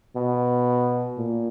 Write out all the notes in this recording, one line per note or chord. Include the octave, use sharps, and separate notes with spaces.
B2
A#2